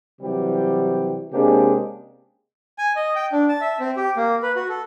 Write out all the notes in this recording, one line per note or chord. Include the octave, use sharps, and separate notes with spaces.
C3 E3 F#3 G3 G4
C3 G#3 A#3 C#4 D4 G4
G#5
D#5
G5
D4
A5
E5
C4
G4
A#3
B4
F#4
A4